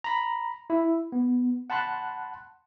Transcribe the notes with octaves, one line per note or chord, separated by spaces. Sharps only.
A#5 B5
E4
B3
F#5 A5 B5 C6 F#6